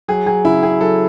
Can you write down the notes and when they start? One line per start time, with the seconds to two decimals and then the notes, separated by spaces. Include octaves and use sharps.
0.08 F#3 G#4
0.26 F#3 G#4
0.45 C#3 E4
0.63 C#3 G#4
0.81 F#3 A4